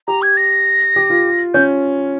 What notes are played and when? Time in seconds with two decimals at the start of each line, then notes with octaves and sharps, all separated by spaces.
0.08 G4 A#5
0.22 G#6
0.37 A#6
0.96 G4
1.10 F4
1.54 C#4 G6